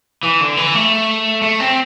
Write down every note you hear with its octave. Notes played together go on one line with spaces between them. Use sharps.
E3
D3
E3
A3
A3
C4